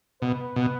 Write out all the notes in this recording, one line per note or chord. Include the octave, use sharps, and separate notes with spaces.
B2 B4
B2